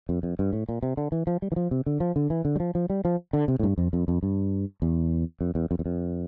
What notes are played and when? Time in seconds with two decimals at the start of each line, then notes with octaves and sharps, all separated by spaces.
0.09 F2
0.23 F2
0.39 G2
0.53 A2
0.69 A#2
0.83 C3
0.97 D3
1.12 E3
1.27 F3
1.42 G3
1.52 E3
1.56 F3
1.71 C3
1.86 D3
2.00 F3
2.16 D3
2.30 E3
2.45 D3
2.56 G3
2.60 F3
2.75 F3
2.90 G3
3.05 F3
3.33 D3
3.48 C3
3.59 A2
3.63 G2
3.78 F2
3.93 F2
4.08 F2
4.23 G2
4.82 E2
5.41 F2
5.55 E2
5.71 F2
5.79 E2
5.86 F2